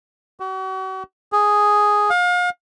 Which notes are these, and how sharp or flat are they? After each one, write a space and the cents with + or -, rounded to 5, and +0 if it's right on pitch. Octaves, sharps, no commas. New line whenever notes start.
F#4 +40
G#4 +0
F5 +35